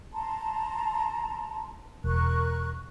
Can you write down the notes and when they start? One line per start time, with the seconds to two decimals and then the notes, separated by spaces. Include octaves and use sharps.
0.13 A5 A#5 C6
2.04 E1 A#4 C#6 F#6